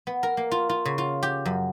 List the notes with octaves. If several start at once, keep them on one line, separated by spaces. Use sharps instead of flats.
B3
A#4
A#3
F4
F4
C#3
F4
G4
F#2